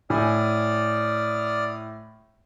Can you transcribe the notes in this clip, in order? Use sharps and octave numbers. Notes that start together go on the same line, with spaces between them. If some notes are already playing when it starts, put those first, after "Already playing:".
A2 D5 G#5 D#6 F6